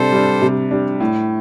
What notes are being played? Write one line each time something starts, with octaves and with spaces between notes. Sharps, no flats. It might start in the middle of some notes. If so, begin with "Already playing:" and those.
Already playing: C3 G3 D4 A4 C5
G3 D4
C3
G3 D4
A2